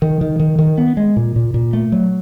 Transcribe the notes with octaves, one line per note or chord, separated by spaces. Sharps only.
D#3
D#3
D#3
D#3
B3
G#3
A#2
A#2
A#2
A3
F#3